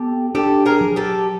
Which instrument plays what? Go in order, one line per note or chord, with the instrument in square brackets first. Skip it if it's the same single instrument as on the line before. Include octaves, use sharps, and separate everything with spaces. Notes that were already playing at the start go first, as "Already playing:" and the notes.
Already playing: [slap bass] B3 [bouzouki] G4 A4
[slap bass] D4 [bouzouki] G4 A4
[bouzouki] G#4 A#4
[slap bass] F#3
[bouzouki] G4 A4